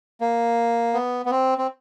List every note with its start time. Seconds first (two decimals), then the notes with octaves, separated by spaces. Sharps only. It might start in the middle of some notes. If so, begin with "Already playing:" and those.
0.21 A#3
0.94 B3
1.26 B3
1.31 C4
1.58 C4